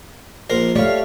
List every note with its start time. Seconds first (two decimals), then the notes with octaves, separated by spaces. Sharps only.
0.50 A#1 A#4 C5
0.76 G3 A3 C#5 F5